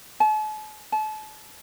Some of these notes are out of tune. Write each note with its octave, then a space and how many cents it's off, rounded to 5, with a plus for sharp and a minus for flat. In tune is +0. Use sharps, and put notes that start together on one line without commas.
A5 -45
A5 -35